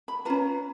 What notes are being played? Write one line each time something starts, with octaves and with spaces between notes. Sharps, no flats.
B5
C#4 F4 B4 A#5